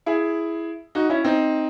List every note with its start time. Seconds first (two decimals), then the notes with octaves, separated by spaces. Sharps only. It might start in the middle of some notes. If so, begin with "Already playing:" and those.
0.06 E4 G#4
0.95 D#4 F#4
1.09 C#4 E4
1.24 C4 D#4